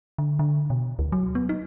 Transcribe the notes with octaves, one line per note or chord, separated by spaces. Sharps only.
D3
D3
B2
D2
F#3
B3
D#4